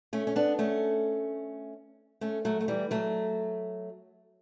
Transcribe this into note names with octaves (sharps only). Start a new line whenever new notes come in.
A3 C#4
C#4
B3 D4
A3 C#4
A3 C#4
F#3 A3
A3
E3 G3
F#3 A3